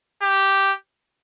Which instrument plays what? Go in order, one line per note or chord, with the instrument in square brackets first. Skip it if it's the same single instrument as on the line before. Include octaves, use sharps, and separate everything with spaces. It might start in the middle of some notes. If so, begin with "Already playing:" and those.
[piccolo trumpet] G4